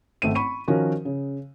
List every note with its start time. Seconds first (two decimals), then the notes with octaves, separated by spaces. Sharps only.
0.22 G#1 A3 C4 D#7
0.35 B5 C#6 D#7
0.68 D#3 F3 C#4 F#4 A#4
1.05 C#3